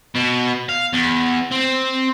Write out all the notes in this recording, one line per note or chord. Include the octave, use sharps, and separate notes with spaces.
B2
F5
E2
C4